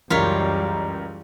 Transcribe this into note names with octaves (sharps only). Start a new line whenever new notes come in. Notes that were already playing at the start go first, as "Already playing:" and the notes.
C#2 F#2 E3 G3 F4 A#4 C#5 B6